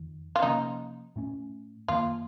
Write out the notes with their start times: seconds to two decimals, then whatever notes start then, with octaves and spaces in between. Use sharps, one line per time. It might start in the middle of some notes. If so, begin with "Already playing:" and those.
Already playing: F2 D#3
0.36 F4
0.42 C3 F3 A#3 C#4 D#4
1.16 A2 A3 C#4
1.88 F#2 D#3 A#3 F4